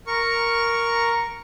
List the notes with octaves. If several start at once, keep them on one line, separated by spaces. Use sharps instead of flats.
A#4 C#6